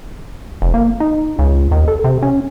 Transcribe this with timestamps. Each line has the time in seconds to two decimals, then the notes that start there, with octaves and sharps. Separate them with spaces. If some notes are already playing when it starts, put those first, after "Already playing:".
0.62 F1
0.74 A#3
1.00 D#4
1.39 C#2
1.71 D#2
1.88 A4
2.04 C3
2.22 C#4